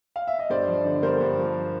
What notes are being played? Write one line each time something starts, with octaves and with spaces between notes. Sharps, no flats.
F5
E5
D#5
G2 C5 D5
F3
D3
G2 A#4 C5
G2
F3